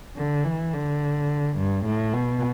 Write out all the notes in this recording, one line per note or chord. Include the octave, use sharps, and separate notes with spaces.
D3
E3
D3
G2
A2
B2